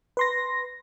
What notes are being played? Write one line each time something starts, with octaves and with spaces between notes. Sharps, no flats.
B4 C6 A#6